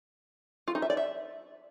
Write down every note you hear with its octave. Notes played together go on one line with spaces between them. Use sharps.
F4
D#4
E5
D5
E5